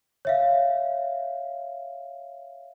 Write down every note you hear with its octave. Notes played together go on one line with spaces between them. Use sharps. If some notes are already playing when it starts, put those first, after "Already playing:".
C#5 E5 F5